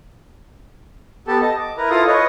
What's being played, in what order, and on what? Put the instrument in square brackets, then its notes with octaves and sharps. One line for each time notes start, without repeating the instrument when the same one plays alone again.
[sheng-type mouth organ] B3 G4 A4 A5
D#5 A5
D6
E4 A#4 B4 A#5
E4 F4 A4 F5 D#6
B4 C#5 D#5